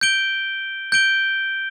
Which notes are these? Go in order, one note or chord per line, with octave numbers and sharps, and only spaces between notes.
G6 D7 G7
G6 D7 G7